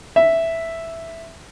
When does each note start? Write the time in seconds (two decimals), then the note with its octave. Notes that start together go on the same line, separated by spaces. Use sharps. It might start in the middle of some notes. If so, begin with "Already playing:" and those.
0.16 E5